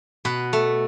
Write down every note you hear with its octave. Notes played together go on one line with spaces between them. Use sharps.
B2 B4
A3